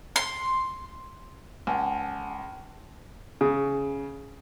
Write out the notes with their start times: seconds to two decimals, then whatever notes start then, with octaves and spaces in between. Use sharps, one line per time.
0.16 C6
1.67 C#2 F#5 G#5 A5
3.41 C#3